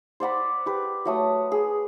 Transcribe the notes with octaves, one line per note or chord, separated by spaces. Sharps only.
C5 D5 F#5 B5
G4 B4
F#3 A3 D#6
G#4